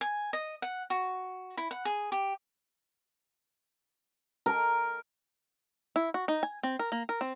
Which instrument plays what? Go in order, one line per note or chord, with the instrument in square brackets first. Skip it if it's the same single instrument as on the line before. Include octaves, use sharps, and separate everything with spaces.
[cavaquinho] G#5
D#5
F#5
F#4
E4
F#5
G#4
G4
[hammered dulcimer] A#4
[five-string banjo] E4
F#4
D#4
G#5
C4
A#4
A#3
A#4
C4